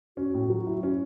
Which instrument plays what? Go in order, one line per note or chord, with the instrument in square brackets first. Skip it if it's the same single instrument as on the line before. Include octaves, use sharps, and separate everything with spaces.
[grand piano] C#4 [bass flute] F#4
[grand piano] A2
F#3
E4
C#4